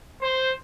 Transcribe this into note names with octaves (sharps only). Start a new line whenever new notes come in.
C5